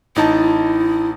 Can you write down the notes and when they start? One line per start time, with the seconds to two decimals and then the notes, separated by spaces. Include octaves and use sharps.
0.16 A1 D#4 E4 A5